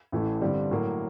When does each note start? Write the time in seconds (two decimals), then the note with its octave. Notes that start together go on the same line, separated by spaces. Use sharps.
0.12 A1 A2 E3 A3
0.41 G2 D3 G3 C4
0.71 A2 F#3 A#3